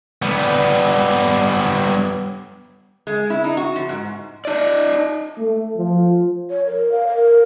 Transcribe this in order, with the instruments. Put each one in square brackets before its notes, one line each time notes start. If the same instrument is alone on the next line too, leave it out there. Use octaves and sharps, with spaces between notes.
[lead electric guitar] G3 B3
[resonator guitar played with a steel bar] G#3
E4
D#4
F#4
F3
G#2
[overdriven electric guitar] D#4 D5
[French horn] A3
F3
[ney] C#5
A#4
F5
A#4